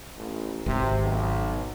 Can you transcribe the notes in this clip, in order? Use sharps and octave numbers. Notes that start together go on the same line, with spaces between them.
A1
G#1 C3
B1